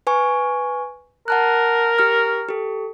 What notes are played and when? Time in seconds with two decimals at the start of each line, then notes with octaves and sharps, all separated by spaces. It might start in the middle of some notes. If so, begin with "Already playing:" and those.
0.07 B4 G#5 C#6
1.28 A#4 F#5 A5 F#6
1.99 G4 F6
2.49 G4 A4